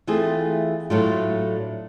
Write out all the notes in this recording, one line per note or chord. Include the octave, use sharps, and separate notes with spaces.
E3 A3 C4 F4 G#4
A2 F#3 A3 D4 F4